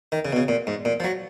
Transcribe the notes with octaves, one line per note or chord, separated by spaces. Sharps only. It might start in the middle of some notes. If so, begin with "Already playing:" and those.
D#3
C#3
B2
C#3
A#2
G#2
A#2
F3
F#3